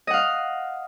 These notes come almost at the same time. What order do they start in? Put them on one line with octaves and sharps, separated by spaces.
D#5 F#5 F5